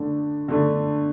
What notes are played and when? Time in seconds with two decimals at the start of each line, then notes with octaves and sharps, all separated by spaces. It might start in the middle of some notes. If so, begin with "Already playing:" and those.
Already playing: D3 A3 D4
0.48 D3 A3 D4